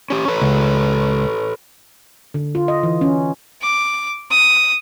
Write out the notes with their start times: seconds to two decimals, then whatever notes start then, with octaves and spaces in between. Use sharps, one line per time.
0.10 C#4 G4
0.28 A4 B4 C#5
0.42 C#2
2.34 D3
2.55 F4
2.68 D#5
2.83 E3
3.01 C#4
3.62 D6
4.31 D#6